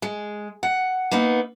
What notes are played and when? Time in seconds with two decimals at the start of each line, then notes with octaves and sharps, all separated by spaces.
0.02 G#3
0.63 F#5
1.11 A#3 B3 D#4